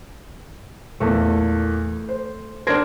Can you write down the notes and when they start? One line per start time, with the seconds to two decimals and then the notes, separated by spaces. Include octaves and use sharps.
1.00 E2 A#2 A3
2.09 C5
2.67 D4 A#4 C5 G#6 A#6 D7